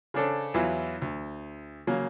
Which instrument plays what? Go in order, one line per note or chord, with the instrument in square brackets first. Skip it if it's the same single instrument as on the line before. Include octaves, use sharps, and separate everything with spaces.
[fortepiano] C#3 C#4 D4 A4 C5
E2 E3 F#3 E4 F4
D2
C#3 F#3 A#3